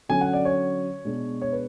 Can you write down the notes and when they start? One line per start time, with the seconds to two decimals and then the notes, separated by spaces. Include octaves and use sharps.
0.09 D3 F#3 C#4 G#5
0.21 F#5
0.33 D5
0.45 C#5
1.05 B2 G#3 D4
1.41 C#5
1.52 B4